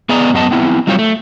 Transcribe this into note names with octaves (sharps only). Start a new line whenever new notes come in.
B3 G#4 D5 D#5 G#5 A#5
F#2 B3 D#5 A5
B3 C4 E4
F#3 G3 C4 F4 C5 C#5
A3